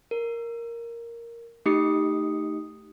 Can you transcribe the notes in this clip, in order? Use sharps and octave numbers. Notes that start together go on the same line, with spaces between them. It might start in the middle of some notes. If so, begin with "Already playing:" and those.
A#4
A3 D#4 G4 D#6 C7 C#7